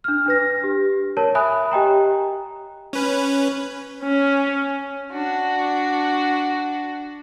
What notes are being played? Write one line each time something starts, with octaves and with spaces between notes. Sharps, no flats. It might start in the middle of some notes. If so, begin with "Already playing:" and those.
D4 F6
D4 B4 A#6
G4
A#4 C#5 A5
E5 G#5 B5 D#6 F#6
G4 D#5 G5 A#5
C#4 B4
C#4
D4 F#4